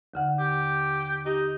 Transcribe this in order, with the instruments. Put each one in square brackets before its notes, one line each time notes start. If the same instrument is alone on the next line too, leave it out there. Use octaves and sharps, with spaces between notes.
[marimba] D#2 D3 F#5
[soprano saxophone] G4
[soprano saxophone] D#4 [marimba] G4